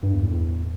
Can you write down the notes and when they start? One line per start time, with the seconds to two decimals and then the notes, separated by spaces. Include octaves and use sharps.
0.03 G2
0.13 E2
0.23 A2
0.32 E2